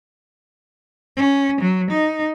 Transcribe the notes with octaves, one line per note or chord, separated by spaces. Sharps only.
C#4
F#3
D#4